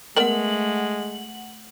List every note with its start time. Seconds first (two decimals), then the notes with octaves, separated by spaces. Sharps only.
0.16 G#3 A3 B3 A#4 C5 F#5 F#7